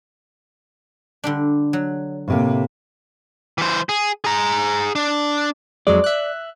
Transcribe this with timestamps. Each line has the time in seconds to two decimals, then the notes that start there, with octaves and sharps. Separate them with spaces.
1.24 D3 G3 D4
1.73 F#3
2.28 A2 C3 A#3
3.58 E3 C5
3.89 G#4
4.24 G#4 A#5
4.95 D4
5.87 F2 F#3 G#3 D5
6.04 E5 F#6